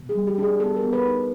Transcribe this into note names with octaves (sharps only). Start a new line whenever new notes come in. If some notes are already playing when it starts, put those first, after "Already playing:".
Already playing: B2
G#4
G3
G4
D4 G#4
B3 A4
A#4
B3
B4
D#4